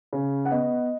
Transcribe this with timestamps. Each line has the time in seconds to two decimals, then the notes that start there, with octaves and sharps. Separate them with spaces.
0.13 C#3
0.45 F#5
0.51 B3 D#5